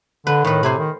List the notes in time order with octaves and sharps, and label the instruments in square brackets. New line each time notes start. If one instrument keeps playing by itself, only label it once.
[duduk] D3 [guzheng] B4
[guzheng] A2 B4 [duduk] D#3
[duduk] C3 [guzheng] C5 G#5 B5
[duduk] D#3